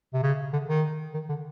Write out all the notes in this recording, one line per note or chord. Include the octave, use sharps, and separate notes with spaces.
C3
C#3
D3
D#3
D#3
D3